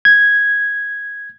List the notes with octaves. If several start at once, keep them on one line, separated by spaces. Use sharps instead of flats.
G#6